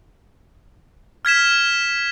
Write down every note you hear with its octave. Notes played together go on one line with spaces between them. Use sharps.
F6 G#6 B6 E7